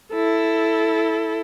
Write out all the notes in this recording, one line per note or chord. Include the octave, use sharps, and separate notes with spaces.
E4 A4